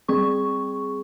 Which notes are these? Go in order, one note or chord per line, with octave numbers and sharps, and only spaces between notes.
G3 C4 G#4 C#6